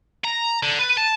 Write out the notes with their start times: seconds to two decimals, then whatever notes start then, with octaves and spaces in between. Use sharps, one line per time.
0.24 A#5
0.63 D3
0.79 B4
0.97 A5